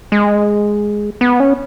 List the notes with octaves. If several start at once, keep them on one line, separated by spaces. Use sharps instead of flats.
G#3
B3
C#4